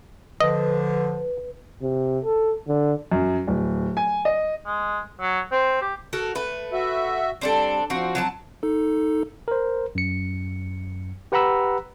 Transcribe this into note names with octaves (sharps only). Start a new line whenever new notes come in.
D3 F3 B4 D#5
C3
A4
D3
F#2
D1
G#5
D#5
G#3
F#3
C4
G4
F#4 A4 A#4
A3 B4
F#4 E5
G3 C4 D4 A4
F3 C4 F#4
F#3 C4 A5
D#4 A4
A#4 C5
F#2 C#7
G4 B4 F#5 A#5 B5 E6